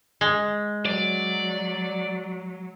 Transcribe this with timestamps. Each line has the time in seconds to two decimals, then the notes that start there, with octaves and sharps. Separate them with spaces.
0.21 G#3
0.86 F#3 D5